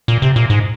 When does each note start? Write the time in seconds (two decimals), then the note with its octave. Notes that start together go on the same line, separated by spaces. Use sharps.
0.08 A#2
0.22 C3
0.36 A#2
0.50 G#2